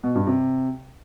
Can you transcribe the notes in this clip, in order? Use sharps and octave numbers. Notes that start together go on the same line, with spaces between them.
B2
G2
C3